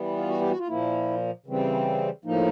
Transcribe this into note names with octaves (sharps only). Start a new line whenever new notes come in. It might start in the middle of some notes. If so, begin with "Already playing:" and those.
Already playing: E3 G3 B3
F4
F#4
G4
F#4
F4
A#2 F3 A#3 E4
C#3 E3 G3 C4
A2 F3 A#3 D#4